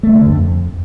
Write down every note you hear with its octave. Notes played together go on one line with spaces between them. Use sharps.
A3
D3
F2